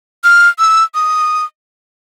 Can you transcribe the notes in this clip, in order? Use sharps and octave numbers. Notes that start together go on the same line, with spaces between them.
F6
E6
D#6